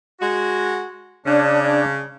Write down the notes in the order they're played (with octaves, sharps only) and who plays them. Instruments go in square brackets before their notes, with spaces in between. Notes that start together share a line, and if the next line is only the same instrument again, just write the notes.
[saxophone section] G#3 F#4
[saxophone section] C#3 [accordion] D4